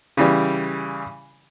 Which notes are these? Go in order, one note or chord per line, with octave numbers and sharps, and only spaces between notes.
C#3 E3 G3